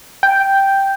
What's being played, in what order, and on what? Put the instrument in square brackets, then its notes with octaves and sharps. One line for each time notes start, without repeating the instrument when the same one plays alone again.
[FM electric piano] G5